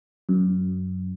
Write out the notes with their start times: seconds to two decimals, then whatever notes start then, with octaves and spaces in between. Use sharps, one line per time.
0.29 F#2